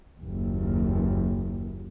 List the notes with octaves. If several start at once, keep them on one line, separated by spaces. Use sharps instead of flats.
F#1 D#2